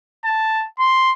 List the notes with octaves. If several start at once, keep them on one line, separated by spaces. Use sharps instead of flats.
A5
C6